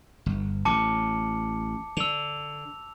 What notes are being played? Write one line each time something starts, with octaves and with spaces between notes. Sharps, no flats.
G1
A1 A2 A5 D6 C#7
D3 E6 F7